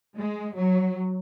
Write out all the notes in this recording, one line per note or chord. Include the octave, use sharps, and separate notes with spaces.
G#3
F#3